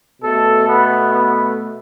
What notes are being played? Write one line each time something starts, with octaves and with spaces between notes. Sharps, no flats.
B2 A3 A4
B3
B3